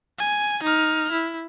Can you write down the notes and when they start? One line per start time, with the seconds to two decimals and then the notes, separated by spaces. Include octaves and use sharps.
0.18 G#5
0.63 D#4 F6
1.12 E4